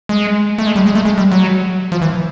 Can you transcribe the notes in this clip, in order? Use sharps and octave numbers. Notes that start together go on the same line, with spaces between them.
G#3
A3
G#3
G3
G#3
A3
G#3
G3
F#3
F3
E3